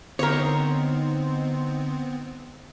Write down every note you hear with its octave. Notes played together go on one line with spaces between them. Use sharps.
D3 B3 C4 D#4 A#4 C5 C#5